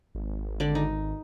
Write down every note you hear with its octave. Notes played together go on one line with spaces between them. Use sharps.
G#1
D3 D5
D#4